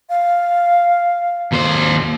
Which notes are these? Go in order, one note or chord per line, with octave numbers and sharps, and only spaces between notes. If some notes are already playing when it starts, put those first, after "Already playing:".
F5
D#2 C5